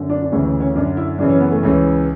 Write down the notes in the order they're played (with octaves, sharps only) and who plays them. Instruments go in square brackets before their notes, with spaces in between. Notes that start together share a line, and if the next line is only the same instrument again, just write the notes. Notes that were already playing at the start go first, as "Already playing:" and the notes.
Already playing: [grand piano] F#2 D3
D4
D4
D2 C#3 E3 C#4
C#4
C#4
F#2 D3 D4
E4
F#2 C#3 E3 D4
C#4
B3
A3
C#2 C#3 E3